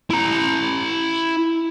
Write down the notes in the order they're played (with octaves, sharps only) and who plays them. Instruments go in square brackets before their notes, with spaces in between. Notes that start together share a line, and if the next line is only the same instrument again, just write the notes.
[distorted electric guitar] E4 A#5